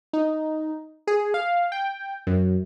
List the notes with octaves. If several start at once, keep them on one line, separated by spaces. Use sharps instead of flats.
D#4
G#4
F5
G5
F#2